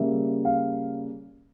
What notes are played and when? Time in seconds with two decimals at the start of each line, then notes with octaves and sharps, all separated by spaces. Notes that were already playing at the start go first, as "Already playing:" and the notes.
Already playing: C#3 G3 A#3 E5
0.45 F5